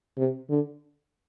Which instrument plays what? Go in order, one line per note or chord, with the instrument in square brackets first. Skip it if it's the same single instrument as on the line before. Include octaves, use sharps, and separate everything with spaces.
[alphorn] C3
D3